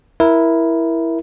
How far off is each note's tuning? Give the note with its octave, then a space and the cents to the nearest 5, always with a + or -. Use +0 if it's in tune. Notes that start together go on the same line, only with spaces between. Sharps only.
E4 +0 A#4 +15